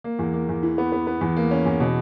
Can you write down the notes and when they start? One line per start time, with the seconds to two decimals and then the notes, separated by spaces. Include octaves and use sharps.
0.04 A#3
0.19 E2
0.34 A#3
0.49 E2
0.63 E3
0.78 B3
0.92 B3
1.07 B3
1.21 E2
1.37 A#3
1.51 C#4
1.65 E2
1.80 B2